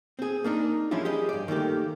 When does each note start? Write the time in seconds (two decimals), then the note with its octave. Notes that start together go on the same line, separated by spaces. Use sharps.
0.19 C4 G#4
0.44 A#3 D4 D#4 A#4
0.91 F3 G#3 C#4 D4 E4 F4
1.05 G4 G#4 D#5
1.29 G2 D5
1.48 D#3 A3 A#3 G4